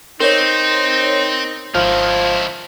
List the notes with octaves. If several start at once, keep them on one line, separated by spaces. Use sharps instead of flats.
C4 D#4 A#4 C5 C#5
G#1 D#3 F3 E4 F6